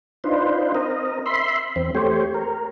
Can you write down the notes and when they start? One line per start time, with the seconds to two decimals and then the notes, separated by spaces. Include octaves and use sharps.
0.24 D4 D#4 F4 B4 C5
0.75 C4 A#4 D#5
1.26 E5 B5 C6
1.76 E2 C4
1.95 A3 G4 C5 C#5
2.34 A#4